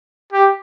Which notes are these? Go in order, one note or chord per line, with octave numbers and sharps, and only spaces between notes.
G4